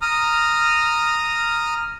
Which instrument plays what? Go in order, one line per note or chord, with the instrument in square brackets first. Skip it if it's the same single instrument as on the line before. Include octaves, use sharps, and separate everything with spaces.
[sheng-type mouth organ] A#5 D#6 F6